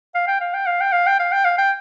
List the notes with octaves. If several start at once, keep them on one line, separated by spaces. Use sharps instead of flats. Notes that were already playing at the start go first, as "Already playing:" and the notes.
F5
G5
F5
G5
F5
G5
F5
G5
F5
G5
F5
G5